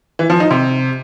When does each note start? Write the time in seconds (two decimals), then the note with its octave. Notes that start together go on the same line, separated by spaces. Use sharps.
0.19 E3
0.30 F3
0.40 D#4
0.51 C3